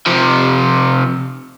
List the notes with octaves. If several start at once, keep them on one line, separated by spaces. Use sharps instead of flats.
C3 F3